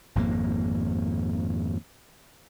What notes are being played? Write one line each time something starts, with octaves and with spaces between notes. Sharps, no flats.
G#1 F2 G#2 A#3